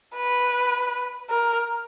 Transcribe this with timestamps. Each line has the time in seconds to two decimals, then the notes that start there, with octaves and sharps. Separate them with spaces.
0.16 B4
1.29 A#4